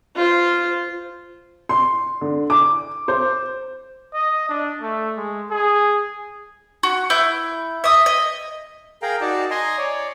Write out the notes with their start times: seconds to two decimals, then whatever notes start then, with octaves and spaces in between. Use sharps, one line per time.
0.16 F4 C5
1.69 C6
2.21 D3
2.50 D6
3.08 C5
4.14 D#5
4.49 D4
4.82 A3
5.17 G#3
5.51 G#4
6.83 F#4
7.10 E4 G6
7.84 E5 D#6
8.06 D#5
9.02 G#4 A#4 F5 G5 A#5
9.21 D#4 F#4 D5 A5
9.50 D#5 G#5 A#5 C6
9.78 C#5 D5